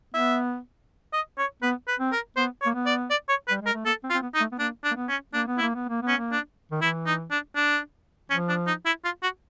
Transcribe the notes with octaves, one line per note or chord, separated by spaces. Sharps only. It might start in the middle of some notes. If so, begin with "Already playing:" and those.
B3 E5
D#5
C#5
B3 B4
B4
C4
A#4
B3 C5
C#5
A#3
B3
D5
D5
C#5
B4
G3
G#3 A#4
A3
A#3 A4
C4
F4
C4
B3
D#4
A3
B3
A#3 D4
D4
A#3
B3
C#4
A#3 D4
B3
E4
A#3
B3
A#3
B3
C#4
A#3
D4
D#3
E3 E4
D#4
D4
D4
F3 C#4
D4
D#4
E4
F4
F#4